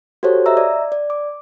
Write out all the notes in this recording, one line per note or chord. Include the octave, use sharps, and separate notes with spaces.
F#4 G4 A4 C5 C#5
D#5 E5 A#5 E6
D5
D5
D6